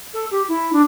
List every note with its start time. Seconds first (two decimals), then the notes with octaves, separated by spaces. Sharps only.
0.13 A4
0.31 G4
0.48 E4
0.72 D4